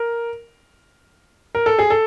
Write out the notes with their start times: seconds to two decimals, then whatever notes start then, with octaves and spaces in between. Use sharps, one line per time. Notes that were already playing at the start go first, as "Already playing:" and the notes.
Already playing: A#4
1.55 A#4
1.66 A4
1.79 G#4
1.90 A4